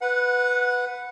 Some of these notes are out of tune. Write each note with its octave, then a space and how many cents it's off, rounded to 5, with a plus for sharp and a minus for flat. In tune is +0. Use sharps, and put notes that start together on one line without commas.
B4 +0 F#5 -15